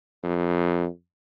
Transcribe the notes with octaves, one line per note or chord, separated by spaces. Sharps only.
F2